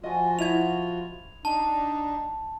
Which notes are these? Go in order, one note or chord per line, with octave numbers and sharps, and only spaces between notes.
F3 F4 F#4 D#5 G#5
E4 D#5 G#6 F7
D4 D#4 A5